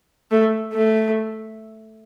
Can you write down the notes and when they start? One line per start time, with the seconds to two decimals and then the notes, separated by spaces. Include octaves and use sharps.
0.31 A3
0.73 A3